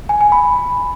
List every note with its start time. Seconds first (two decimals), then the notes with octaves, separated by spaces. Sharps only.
0.09 G#5
0.21 G#5
0.32 B5